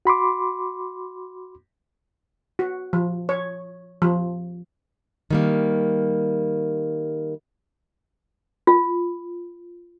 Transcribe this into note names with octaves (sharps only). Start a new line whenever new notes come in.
F#4 B5 C6 D6
F#4
F3
C#5
F3
D#3 G3 A#3
F4